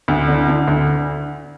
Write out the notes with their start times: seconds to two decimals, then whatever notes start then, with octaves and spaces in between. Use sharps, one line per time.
0.08 D2
0.28 D3
0.48 D3
0.68 D2